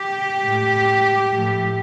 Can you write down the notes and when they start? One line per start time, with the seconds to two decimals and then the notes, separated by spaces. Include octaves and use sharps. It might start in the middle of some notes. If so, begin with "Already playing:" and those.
Already playing: G4
0.44 A2 A3
1.32 A2 F3 A3